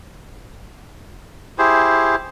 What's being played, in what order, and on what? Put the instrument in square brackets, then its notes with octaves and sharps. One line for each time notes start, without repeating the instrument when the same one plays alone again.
[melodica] E4 G4 G#4 C5